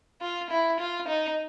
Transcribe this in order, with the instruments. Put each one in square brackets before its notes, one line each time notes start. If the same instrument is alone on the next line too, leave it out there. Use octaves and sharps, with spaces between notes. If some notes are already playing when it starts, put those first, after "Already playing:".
[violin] F4
E4
F4
D#4